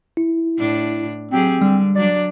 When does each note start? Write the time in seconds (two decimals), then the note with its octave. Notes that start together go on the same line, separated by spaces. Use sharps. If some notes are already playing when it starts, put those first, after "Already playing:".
0.17 E4
0.58 A2 D4
1.31 F#3 C4 G4 G#4
1.62 D3 G3
1.95 F#3 D4 D5